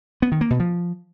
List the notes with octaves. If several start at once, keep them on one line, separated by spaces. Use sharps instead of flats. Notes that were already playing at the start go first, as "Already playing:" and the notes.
B3
D#3
A#3
B2
F3